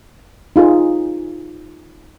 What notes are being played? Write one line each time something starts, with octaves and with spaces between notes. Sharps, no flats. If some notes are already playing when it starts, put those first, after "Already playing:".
D#4 F4 G#4